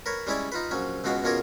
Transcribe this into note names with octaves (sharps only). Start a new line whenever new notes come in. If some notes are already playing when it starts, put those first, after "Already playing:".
A#4 B4 C#5
G3 G#3 C#4 E4 C#5 D5
D#4 F4 B4
A#1 F#3 C#4
C#2 B2 G#3 B3 F#4 F5
B2 A#3 C#4 F4 G#4 A#4